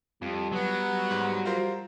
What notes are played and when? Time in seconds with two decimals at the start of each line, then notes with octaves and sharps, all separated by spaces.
0.22 F2 G3
0.52 F#3 B3
1.11 G#2
1.46 F4 A#4 C5